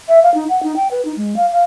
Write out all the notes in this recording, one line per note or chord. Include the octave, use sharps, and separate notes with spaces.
E5
F5
D#4
F#5
D#4
G5
B4
D#4
G#3
F5
F5